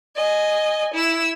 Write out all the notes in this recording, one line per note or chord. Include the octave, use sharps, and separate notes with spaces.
D#5 G#5
E4 E6